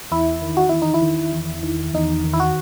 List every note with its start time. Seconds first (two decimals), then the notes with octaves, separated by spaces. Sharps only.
0.11 E2 E4
0.42 D#3
0.57 F#4
0.69 E2 E4
0.82 D#4
0.94 E4
1.02 D#3
1.33 E2
1.63 D#3
1.94 E2 D#4
2.24 D#3
2.33 E4
2.40 F#4